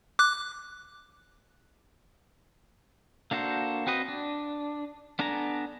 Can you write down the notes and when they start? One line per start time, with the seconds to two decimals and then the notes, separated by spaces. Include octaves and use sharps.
0.19 D6 F#6
3.31 A#3 D4 F#4 A4 C5
3.87 C4 F#4 B4 D#5
4.08 D4
5.19 B3 D4 A4 G#5 A#5